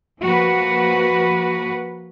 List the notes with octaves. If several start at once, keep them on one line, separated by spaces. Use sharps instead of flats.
F3 A#3 F#4 B4